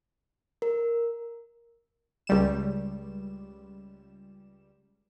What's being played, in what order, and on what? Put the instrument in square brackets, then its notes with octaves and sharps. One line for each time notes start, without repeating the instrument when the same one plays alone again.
[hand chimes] A#4
[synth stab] C#2 G3 E7